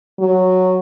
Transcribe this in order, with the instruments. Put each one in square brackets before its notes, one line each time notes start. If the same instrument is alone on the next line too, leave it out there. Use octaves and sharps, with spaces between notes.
[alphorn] F#3